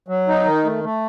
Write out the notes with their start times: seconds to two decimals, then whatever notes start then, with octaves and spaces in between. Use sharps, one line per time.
0.08 F#3
0.28 D#4
0.45 D#3
0.65 A3
0.84 A3